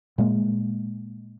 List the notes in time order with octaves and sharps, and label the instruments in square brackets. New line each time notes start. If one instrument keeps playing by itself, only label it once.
[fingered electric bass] A#2 G#3 A#3